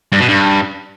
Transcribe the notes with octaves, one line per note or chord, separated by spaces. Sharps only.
G2
B2
G2